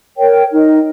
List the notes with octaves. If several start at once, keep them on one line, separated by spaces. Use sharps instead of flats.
A#4 C#5 G5
D#4 A#4 D#5